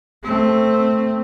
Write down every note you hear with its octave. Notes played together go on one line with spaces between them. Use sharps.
A3 C4